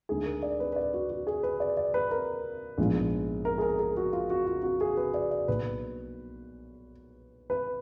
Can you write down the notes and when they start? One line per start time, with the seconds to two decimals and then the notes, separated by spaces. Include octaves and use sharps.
0.09 D2 D3 G#3 D#4 G#4
0.25 A#4
0.42 D5
0.60 B4
0.73 B4
0.76 D5
0.94 F#4
1.11 F#4
1.27 G#4
1.43 B4
1.60 D5
1.77 D5
1.94 B4
2.11 A#4
2.78 A#1 G#2 F3 G#3 B3
3.45 A#4
3.58 G#4
3.62 A#4
3.79 G#4
3.97 F#4
4.13 F4
4.30 F#4
4.46 F4
4.63 F#4
4.81 G#4
4.97 B4
5.14 D5
5.31 D5
5.48 B1 B2 A#3 B4
7.50 B4